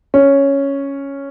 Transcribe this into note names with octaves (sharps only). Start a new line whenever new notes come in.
C#4